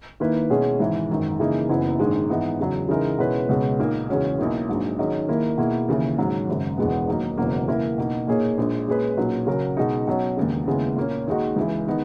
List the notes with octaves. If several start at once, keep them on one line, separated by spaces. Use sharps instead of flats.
D#2 D#3 A#3 E4 B4
B2 G#3 C#4 E4 G#4
G#1 G#2 E3 G#3
G#1 F#2 D#3
C#3 E3 A#3 D#4 G#4
F#1 F#2 E3 B3 E4
A#1 G#2 D#3 G#3
G#2 E3 B3 D#4
E2 C#3 F#3
C#3 E3 G#3 D#4 A#4
B2 G#3 C#4 E4 B4
C#2 B2 G#3 C#4
B1 A#2 A#3 D#4 A#4
E2 C#3 G#3 C#4 F#4
B1 B2 A#3 E4
A#1 G#2 F#3
D#3 F#3 C#4 G#4 D#5
D#2 D#3 A#3 E4 A#4
B2 A#3 E4 G#4
D#2 C#3 E3
G#1 G#2 F#3 C#4
G#1 F#2 C#3
E1 E2 B2 G#3 B3
D#3 F#3 A#3 D#4
F#1 E2 B2 F#3 A#3
C#3 E3 A#3 E4 A#4
B2 A#3 D#4
A#2 A#3 D#4 G#4 C#5
A#1 A#2 G#3
A#2 G#3 C#4 G#4 B4
B1 A#2 F#3 C#4 F#4
C#3 F#3 C#4 F#4 A#4
B2 G#3 D#4
B2 F#3 C#4
E1 D#2 C#3
D#2 C#3 G#3 B3 E4
A#2 A#3 C#4
D#2 D#3 G#3 D#4 F#4
C#2 C#3 E3
D#3 G#3 B3 D#4